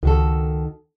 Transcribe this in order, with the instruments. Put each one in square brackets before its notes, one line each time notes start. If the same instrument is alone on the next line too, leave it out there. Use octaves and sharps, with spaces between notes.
[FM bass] C#2 [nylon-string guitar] D#3 F#4 A4